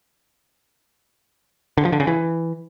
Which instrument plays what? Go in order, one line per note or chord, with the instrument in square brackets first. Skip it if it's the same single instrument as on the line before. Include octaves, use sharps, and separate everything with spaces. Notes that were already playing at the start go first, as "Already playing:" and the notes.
[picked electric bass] D3
F3
D3
C#3
E3